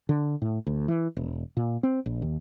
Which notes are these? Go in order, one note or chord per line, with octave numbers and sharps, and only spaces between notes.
D3
A2
D2
E3
E1
A#2
C4
A#1
D#2